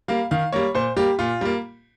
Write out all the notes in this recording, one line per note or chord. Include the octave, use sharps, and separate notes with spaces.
G3 A#3 F5
D#3 F5
G3 A#3 C#5
A#2 C5
G3 A#3 G4
A#2 F4
G3 A#3